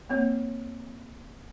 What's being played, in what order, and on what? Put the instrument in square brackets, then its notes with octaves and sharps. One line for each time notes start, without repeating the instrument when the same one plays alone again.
[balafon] A#3 C4 C#5